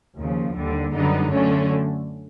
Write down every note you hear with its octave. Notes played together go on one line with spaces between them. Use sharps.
D#2 C#3 F3
D#2 D3 G3
F#2 D3 G3 B3 D#4
D3 F#3 A3 C#4